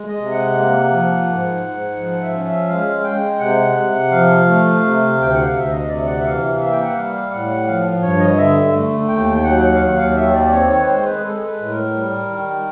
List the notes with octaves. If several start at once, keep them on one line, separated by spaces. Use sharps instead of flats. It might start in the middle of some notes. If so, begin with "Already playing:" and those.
Already playing: G#3
D#5
C3
F#5
A#3
F3
G#2
G#2
F3 F#5
E5
C#4
E5
G#3 F5
G#3 G5
C3 F#5
C3
F3 F5
A3
C3
D2 G5
F#5
F5
D2
E5
D#5
C3 D5
F#5
E5
E3 F5
F5
A#3 E5
G5
F#5
G3 F5
A2 F#5
F3 F5
G2 C#5
D#5
D3 E5
A3
D#2 G5
G5
F#3 F#5
F5
D#2 F#5
F5
D#3 E5
D5
D5
C4 C#5
C#5
B4
G#3 C5
B4
G#4
G#3 A4
B4
A2
A#4
G3
D#3